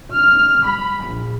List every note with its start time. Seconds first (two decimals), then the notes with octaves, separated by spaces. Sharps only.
0.12 F6
0.64 B5
1.05 A#1